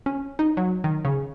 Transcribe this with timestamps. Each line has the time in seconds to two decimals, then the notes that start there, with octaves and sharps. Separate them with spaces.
0.06 C#4
0.39 D#4
0.57 F#3
0.84 D#3
1.05 C#3